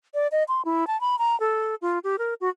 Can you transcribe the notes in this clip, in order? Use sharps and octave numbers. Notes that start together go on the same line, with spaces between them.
D5
D#5
C6
E4
A5
B5
A#5
A4
F4
G4
A#4
F#4